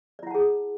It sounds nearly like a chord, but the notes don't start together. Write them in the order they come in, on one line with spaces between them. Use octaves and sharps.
D5 E4 F#5 A5 G#4